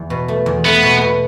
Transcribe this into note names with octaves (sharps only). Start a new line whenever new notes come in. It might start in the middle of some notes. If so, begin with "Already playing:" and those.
Already playing: E2
B2
A3
E2
A3 B3
B2
B2